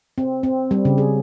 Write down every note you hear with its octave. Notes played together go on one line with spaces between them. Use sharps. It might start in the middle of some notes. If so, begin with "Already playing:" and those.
C4
C4
G3
C#3
G#4